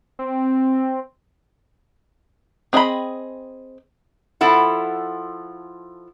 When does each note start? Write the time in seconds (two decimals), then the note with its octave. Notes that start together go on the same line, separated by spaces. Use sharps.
0.19 C4
2.73 C4 G#4 D#5 E5 B5
4.41 F3 E4 A4 F#5